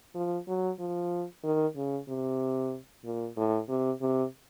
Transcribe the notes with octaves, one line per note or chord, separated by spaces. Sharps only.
F3
F#3
F3
D#3
C#3
C3
A#2
A2
C3
C3